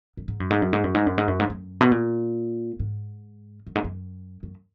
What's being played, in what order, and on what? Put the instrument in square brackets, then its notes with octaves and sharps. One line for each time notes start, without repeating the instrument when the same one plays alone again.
[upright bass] F#2
G#2
F#2
G#2
F#2
G#2
F#2
G#2
F#2
G#2
F#2
G#2
F#2
B2
A#2
G#2
F#2
G#2
F#2
F#2